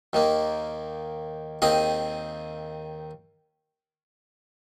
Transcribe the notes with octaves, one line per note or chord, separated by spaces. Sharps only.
D#2 D#3 A#3
D#2 D#3 C4 G#4 D#5